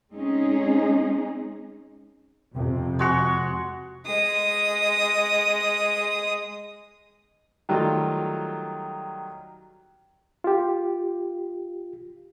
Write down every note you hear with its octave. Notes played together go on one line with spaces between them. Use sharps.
G#3 C4 C#4 D#4 G#4
F2 C3
G#3 F#4 C#6
G#3 D#6
D#3 F#3 G3 A3 F4
F4 G4